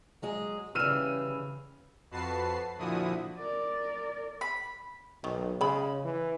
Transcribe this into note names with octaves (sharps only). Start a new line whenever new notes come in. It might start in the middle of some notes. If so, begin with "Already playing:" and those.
F#3 G#3 G#4
C#3 E3 G3 E6 F6 D#7
F2 F#4 B4 A5 C7
A#2 D3 F3 E4 F#4 D#6
A#4 D5
B5
B1 D#3
C#3 G#3 B5
E3